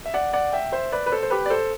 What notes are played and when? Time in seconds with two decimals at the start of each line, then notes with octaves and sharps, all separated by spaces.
0.06 E5
0.14 D5 F#5
0.33 D5 F#5
0.53 E5 G5
0.72 C5 E5
0.92 B4 D5
1.06 B4
1.12 A4 C5
1.23 C5
1.30 G4 B4
1.46 D5
1.50 A4 C5